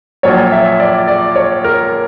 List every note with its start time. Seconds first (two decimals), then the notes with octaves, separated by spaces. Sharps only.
0.23 A#1 A#2 F#3 C#5
0.52 E5
0.80 D5
1.08 D5
1.36 C#5
1.64 A#4